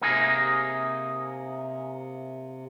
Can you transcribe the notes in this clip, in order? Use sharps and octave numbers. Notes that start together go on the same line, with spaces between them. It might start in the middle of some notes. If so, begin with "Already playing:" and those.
C3 A#3 D#4 G#4